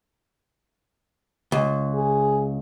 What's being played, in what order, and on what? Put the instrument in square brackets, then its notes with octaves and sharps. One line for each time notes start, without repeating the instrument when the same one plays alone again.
[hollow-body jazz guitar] C#2
[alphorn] G#4